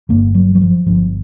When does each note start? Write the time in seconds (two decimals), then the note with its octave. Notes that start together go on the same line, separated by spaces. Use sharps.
0.09 G1 G2 D3 A#3
0.35 F#3
0.55 F#3
0.61 F3
0.86 G1 G2 D3 F3